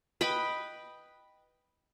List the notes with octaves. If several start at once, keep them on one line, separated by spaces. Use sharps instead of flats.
B4 D#5 G5 B5